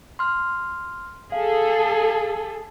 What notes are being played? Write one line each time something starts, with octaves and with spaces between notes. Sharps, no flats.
C6 F6
G#4 A4 F5